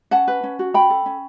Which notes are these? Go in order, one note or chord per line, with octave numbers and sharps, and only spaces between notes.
C#4 F#5 A5
B4
C#4
F#4
C#4 G5 B5
A4
C#4